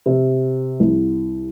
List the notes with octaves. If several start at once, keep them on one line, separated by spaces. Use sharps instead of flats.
C3
C2